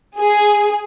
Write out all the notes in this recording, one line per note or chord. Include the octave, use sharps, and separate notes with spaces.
G#4